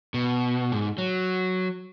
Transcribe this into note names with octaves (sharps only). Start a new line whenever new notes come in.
B2
G#2
F#3